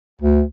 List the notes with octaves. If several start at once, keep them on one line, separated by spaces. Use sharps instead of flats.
D2